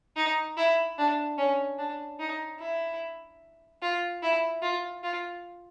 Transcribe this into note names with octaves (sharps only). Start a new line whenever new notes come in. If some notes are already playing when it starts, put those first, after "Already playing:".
D#4
E4
D4
C#4
D4
D#4
E4
F4
E4
F4
F4